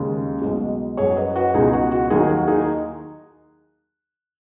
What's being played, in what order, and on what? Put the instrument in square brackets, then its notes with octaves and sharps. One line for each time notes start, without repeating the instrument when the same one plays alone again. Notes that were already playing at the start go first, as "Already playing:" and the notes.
Already playing: [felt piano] D#2 C#3 G#3
B1 B2 G#3
F#2 F#3 G#4 C#5
B4 D#5
F#4 B4
C#2 B2 G#3 D#4 G#4
F#4
F#4
D#2 D#3 F#3 D#4 G#4
F#4
D#4 G#4